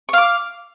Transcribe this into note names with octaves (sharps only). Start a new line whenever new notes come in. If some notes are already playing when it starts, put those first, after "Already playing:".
F5 C#6 D6